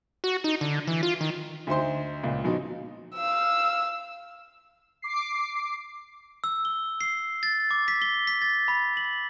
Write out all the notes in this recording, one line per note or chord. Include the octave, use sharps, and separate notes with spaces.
F#4
D#4
D3
E3
F4
D#3
D2 D#4 C5 C6
C#2 A#2
A#1 B2 D#4
F5 E6
D6 C7
E6
G7
C7
A6
D6
B6
G7
B6
A6
B5
F#7